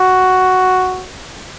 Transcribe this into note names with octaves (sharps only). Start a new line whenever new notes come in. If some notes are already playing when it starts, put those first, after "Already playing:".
Already playing: F#4